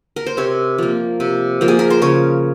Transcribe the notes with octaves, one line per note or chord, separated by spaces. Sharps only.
A#4
C5
C3 C#5
F3 A#3
C3
F3 A#3
G#4
A#4
C5
C#3 C#5